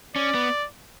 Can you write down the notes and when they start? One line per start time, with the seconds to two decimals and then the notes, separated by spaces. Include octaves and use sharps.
0.15 C#4 D5
0.34 B3